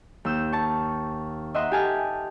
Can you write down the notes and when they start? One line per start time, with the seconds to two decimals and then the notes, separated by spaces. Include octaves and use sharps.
0.25 D#2 E6 G6
0.53 A5 C#6
1.54 D#5 E5 F#5 A#5 C6
1.71 G4 A4 G#5 A5 F6